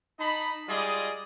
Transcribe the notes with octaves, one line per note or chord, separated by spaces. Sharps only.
D#4 D#5 A5 B5
G3 G#3 F4 G#4 D5 D#5